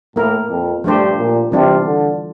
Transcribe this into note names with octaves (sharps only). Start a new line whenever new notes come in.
A2 A#3 E4 A#4
F2
G2 F3 A3 D4 G4 C5
A#2
C3 E3 G3 D4 F4
D3